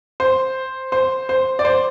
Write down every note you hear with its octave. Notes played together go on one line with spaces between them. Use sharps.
C5
C5
C5
D5
C5